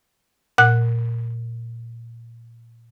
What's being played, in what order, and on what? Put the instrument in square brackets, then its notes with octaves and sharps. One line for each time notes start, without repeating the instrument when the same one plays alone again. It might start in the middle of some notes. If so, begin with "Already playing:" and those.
[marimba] A#2 F#5 F#6